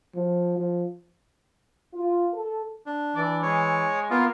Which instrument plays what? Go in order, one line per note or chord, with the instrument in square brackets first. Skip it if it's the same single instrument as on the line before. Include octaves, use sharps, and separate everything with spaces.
[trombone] F3
F3
[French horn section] F4
A4
[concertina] D4
[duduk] E3 [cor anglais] D5
[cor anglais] G#3 [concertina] C#5
[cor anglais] A#3 [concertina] B3 F4